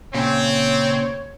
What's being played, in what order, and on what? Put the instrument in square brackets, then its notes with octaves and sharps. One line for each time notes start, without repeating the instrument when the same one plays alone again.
[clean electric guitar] A#2 C#3 [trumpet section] C4 [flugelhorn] C#5